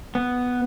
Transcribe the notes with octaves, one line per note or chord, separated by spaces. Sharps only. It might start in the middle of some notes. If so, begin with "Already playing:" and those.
B3